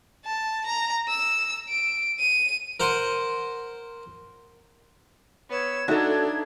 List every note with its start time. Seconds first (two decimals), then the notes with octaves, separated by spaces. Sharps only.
0.25 A5
0.66 A#5
1.09 E6
1.69 D7
2.19 D#7
2.80 A#4 C5 F#5
5.50 B3 C#5 E6
5.88 D4 D#4 F#4 A4 E5 A5 G#6